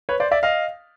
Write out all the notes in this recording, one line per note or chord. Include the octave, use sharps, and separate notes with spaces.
B4 C#5
C5 D5
D5 E5
D#5 F5